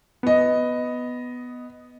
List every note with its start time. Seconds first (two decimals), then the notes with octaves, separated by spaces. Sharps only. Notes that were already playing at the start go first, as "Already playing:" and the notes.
0.23 B3 D#5